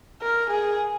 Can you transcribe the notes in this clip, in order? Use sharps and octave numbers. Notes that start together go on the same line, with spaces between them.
A#4
G#4